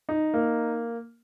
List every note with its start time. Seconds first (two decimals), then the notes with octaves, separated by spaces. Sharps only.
0.09 D#4
0.34 A#3